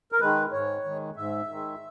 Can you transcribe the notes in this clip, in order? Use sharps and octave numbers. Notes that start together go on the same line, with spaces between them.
A#4
D#3 G#3 B4
G#2 C#5
D#3 G#3
G#2 E5
D#3 G#3